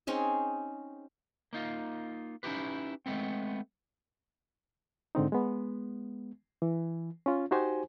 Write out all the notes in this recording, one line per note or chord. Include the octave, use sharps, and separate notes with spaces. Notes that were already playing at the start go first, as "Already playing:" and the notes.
C4 C#4 D#4 G#4
A#3 D#4 F4
C#4 D#4 E4 F#4 G4 B4
G#3 A3 B3 C4
G#2 D3 C4 D#4
G#3 B3
E3
C#4 F4
D#4 F#4 G4 C5 G#5